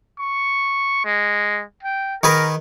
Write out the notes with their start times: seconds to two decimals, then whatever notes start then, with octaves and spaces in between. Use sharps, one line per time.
0.19 C#6
1.05 G#3
1.83 G5
2.23 D#3 G#4 A#4 B4